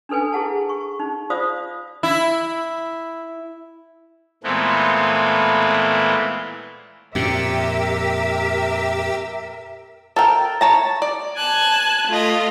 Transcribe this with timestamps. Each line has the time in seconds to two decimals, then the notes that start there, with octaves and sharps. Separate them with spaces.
0.09 D4 D#4 A4 B4 G#5
0.33 E4 G#4 F#5 A5
0.69 C#6
0.99 D#4
1.30 F4 C5 D5 F5 D#6
2.03 E4
4.44 A#2 E3 G#3 A3 B3 C4
7.15 F2 A#2 G4 A#4 E5
10.16 A4 A#4 G5
10.61 C#5 A5 A#5
11.02 D5
11.37 G#5 A5 F#6
12.08 A3 F4 D#5